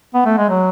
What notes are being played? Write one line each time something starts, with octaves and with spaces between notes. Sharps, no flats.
B3
A3
G#3
F#3